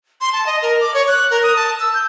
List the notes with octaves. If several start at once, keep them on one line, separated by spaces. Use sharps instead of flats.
C6
A5
D#5
A#4
D6
C#5
F#6
A#4
D#6
A5
E6
G6